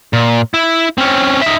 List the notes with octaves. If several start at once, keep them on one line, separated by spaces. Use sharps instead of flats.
A#2
E4
C4 C#4
D#4 E5